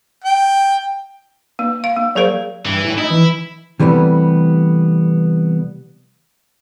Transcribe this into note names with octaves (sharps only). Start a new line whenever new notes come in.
G5
A#3
F5
A#3
F#3 G#4 A#4 C5 F5
G2 E3
A2
D#4 E4
E3
C3 E3 G3 A3 B3